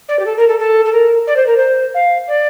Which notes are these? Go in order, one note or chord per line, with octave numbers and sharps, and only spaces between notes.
D5
G4
A4
A#4
A4
A4
A4
A#4
D5
C5
A#4
C5
F5
D5